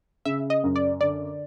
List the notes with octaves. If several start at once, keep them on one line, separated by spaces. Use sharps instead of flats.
C#3 E5
D#5
F#2
D5
D3 D5